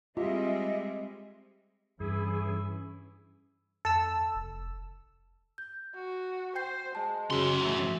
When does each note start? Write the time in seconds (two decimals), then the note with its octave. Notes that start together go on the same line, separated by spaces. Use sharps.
0.17 G3 G#3 C4 F4 G4 D#5 E5
2.00 G2 E3 C#4 E4 G#4
3.85 F2 A4 E6
4.35 F1
5.58 G6
5.95 F#4
6.55 C5 G5 G6 C7
6.95 G#3 A5
7.31 F#2 C#3 F#4 C6
7.61 A1 E5